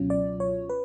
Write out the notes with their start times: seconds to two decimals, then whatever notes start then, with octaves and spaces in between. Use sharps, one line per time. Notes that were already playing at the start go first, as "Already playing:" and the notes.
Already playing: C#2 B2 F#3 C#4 F4
0.10 D5
0.40 C#5
0.70 B4